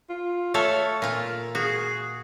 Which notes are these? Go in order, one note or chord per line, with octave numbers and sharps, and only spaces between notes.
F4
A3 A4 C#5 F5
A#2 F4 A#4
F#4 G#4